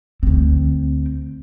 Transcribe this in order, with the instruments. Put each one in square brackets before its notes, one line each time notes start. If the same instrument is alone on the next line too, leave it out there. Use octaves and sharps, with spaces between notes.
[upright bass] D2 C4